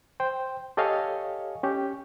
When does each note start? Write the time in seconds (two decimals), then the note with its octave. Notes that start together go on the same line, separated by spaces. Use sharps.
0.20 C5 G5
0.77 G4 A4 C#5 D#5 F5 G#5
1.63 C#4 G4